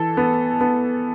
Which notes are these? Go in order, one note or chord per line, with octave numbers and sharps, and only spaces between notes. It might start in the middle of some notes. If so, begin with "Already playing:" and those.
Already playing: E3 A4
B3
B3